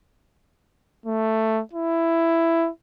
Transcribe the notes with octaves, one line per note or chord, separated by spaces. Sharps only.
A3
E4